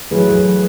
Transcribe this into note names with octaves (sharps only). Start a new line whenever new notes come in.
E3 F#3 A3 E4 G#4 B4